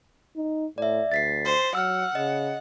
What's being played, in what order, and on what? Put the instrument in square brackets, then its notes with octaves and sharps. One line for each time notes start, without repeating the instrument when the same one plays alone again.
[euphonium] D#4
[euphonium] A2 [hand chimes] D5 E5
[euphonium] D2 [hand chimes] A6 B6 C7
[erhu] C5
[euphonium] F#3 [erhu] F#5 [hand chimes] E6 F6
[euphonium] C#3 [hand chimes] D#5